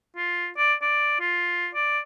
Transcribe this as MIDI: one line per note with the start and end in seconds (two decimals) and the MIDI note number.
0.17 0.49 65
0.57 0.74 74
0.82 1.20 74
1.20 1.68 65
1.74 1.99 74